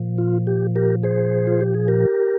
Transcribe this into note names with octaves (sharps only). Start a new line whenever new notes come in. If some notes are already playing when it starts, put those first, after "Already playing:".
Already playing: A#2 F3
F4
G4
G4 A#4
G#4 C5
F4
G4
G#4
G4 A#4